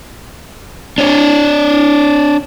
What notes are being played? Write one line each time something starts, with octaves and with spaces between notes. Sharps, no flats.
D4 C#5 D5